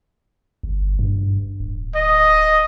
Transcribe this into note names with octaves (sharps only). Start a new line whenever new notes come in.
G1
G2
D1
D#5